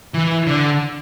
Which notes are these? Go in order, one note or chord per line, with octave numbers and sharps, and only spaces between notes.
E3
D3